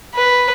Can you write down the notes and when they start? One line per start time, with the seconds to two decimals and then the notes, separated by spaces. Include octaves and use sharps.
0.14 B4